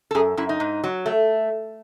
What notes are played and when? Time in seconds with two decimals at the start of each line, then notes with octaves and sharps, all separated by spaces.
0.11 A4
0.15 F#2 G#4
0.37 F#2 E4
0.49 D#4
0.60 G#2
0.84 F#3
1.06 A3